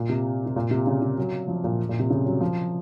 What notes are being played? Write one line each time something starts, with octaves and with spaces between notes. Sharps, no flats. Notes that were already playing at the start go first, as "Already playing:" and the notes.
Already playing: A#2
C3
C3
A#2
C3
C#3
C#3
F#3
F3
A#2
A#2
C3
C#3
F#3
F3